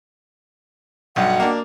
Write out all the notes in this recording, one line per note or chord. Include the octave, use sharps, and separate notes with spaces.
B1 G2 F#4 D#5 F#5 G5
A#3 D4